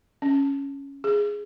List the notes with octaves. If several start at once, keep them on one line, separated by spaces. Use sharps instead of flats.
C#4
G#4